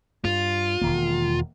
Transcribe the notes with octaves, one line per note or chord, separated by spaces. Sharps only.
G2 F4
E1 D#3 A#3